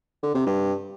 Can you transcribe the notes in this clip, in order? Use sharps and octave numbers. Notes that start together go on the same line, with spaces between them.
D3
C3
G2